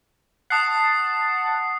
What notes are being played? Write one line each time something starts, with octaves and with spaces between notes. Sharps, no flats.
F#5 A5 D#6 C7